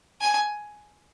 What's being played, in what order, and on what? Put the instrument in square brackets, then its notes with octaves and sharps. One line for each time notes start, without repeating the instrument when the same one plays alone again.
[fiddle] G#5